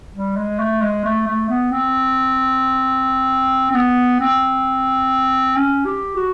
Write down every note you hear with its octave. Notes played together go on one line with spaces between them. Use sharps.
G3
G#3
A3
G#3
A3
A3
B3
C4
C4
B3
C4
C#4
G4
F#4